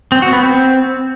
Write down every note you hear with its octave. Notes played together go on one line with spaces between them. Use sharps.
C4
F#4
B3
C4